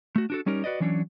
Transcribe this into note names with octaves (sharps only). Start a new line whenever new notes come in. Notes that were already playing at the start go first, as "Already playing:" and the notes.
A3 F#4
D4 F#4 A4
G3 C#4 D#4 G4 A#4
F#4 B4 D5 D#5
E3 F#3 C#4 D4